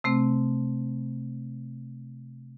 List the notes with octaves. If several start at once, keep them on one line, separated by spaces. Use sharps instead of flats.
C3 A3 C4